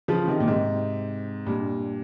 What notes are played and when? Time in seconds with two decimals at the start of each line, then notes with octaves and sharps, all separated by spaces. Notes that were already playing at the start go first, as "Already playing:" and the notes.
0.08 C#3 F3
0.28 C3 D#3
0.40 A#2
0.48 G#2 C3
1.46 G2 A#2